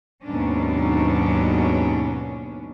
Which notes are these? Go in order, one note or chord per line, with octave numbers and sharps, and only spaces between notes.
D#2 G#2 B2 F#3 C#4 D4